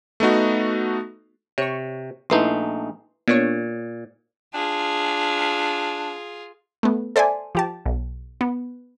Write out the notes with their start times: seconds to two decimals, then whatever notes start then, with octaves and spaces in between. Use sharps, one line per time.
0.20 A3 B3 D#4 F#4
1.58 C3 C#5 C#6
2.30 A#1 A3 D#4 E4 B4 C6
3.28 A#2 B3 D4 C#5
4.54 D4 F4 G#4
6.83 A3 B3
7.16 A4 C5 D5 E5 G#5
7.55 F3 G4 A5
7.86 B1
8.41 B3